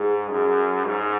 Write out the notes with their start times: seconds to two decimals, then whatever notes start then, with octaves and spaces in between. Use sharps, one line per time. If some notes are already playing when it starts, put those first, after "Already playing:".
Already playing: G#2 G#4
0.30 F#2
0.85 G#2